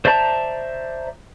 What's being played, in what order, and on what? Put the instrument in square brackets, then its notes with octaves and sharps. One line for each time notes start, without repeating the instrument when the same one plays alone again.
[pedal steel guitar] C5 D5 E5 A5 A#5